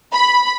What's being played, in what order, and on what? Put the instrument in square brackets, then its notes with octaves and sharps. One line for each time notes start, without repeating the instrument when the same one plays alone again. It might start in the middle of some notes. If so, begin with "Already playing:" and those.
[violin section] B5